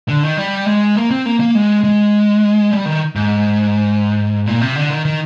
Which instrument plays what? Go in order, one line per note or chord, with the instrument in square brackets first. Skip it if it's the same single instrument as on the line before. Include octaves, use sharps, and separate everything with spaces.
[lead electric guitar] D3
D#3
G3
G#3
A#3
C4
A#3
A#3
G#3
G#3
G3
D#3
G#2
A#2
C3
D3
D#3
D#3